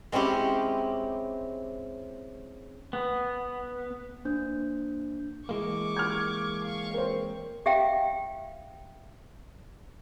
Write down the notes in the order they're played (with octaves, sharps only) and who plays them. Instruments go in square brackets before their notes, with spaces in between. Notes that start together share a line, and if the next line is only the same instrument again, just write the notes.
[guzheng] G#3 C4 C#4 E4 G4
[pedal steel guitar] B3
[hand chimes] A#3 D4 C5 G6
[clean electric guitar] E3 G#3 A#3 [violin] C#6 D6
[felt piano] F6 G#6
[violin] F5 C#6
[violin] C4 [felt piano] A#4 C5
[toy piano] G4 E5 F5 G5